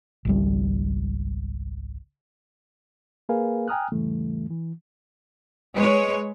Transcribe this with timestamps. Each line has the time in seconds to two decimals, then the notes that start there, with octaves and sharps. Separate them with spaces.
0.25 G#1 C#2 G3
3.29 A#3 G#4 A#4 B4 F5 G#5
3.68 G5 G#5 A#5 D#6 F6 F#6
3.92 E2 G#2 C#3 E3 G3 A3
4.50 E3
5.75 G#3 B4 C#5